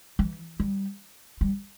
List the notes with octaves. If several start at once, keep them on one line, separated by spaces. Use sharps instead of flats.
E3
G3
G3